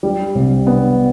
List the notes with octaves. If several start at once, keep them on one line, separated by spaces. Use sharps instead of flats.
G3
C2
B3